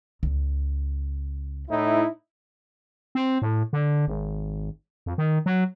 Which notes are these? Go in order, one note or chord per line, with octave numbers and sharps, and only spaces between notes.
C#2
A2 D#4 E4
C4
A2
D3
G#1
F2
D#3
F#3